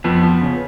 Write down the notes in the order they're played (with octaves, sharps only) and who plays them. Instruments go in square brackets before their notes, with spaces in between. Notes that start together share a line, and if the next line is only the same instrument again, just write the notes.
[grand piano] F2 [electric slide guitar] B3
[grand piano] F3
C#3